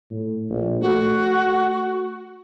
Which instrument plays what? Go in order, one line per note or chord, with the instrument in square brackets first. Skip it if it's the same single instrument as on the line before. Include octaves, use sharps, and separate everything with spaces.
[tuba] A2
A#1
[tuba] A3 [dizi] F#4